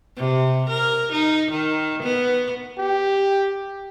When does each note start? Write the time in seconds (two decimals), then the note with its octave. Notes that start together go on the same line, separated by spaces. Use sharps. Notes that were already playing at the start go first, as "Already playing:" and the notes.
0.17 C3
0.70 A#4
1.13 D#4
1.51 D#3
2.03 B3
2.78 G4